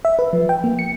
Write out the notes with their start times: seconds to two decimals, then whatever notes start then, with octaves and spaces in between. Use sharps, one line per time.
0.05 E5
0.19 B4
0.33 F3
0.49 G5
0.64 A#3
0.79 C#7